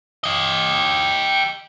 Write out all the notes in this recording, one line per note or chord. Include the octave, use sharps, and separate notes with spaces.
G4 D#5